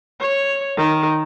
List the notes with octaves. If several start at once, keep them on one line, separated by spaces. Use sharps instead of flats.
C#5
D#3